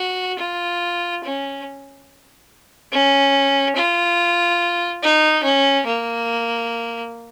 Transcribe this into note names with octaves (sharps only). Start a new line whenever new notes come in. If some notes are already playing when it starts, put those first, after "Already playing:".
Already playing: F#4
F4
C#4
C#4
F4
D#4
C#4
A#3